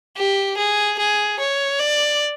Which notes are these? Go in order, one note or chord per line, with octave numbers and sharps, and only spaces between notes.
G4
G#4
G#4
C#5
D5